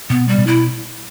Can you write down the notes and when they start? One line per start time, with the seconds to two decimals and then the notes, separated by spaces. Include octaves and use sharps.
0.10 B2 B3
0.28 G3
0.38 B2
0.47 E4